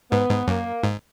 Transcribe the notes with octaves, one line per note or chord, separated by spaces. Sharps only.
G#2 B3
G#2
F#2 A#3
G#2